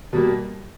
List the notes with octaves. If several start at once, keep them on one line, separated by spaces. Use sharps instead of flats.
B2 G3 A#3